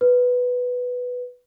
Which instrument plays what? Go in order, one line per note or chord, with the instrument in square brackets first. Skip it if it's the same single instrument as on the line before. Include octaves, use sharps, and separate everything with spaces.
[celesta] B4